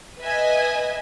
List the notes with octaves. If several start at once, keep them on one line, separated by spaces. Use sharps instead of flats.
B4 D#5 E5 G#5